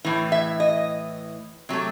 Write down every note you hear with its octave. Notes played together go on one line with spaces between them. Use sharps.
A2 E3
E5
D#5
C3 F#3 A3